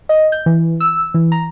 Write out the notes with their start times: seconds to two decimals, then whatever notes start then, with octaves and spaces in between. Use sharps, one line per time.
0.09 D#5
0.32 G6
0.46 E3
0.80 E6
1.14 E3
1.32 A#5